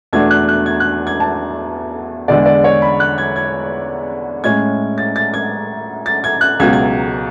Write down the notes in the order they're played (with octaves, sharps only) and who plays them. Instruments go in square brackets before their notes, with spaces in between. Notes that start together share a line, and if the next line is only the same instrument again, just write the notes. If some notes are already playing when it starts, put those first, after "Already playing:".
[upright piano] E2 B2 A3 D4 G#6
F#6
F#6
G#6
F#6
G#6
A5
E2 D3 G#3 D5
D5
C#5
B5
F#6
G#6
G#6
A2 G#3 C#4 G#6
A6
A6
G#6
A6
G#6
F#6
C#2 B2 F#3 G#6
G#6